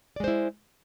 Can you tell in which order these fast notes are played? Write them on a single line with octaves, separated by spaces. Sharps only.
D5 G#3 C5 E4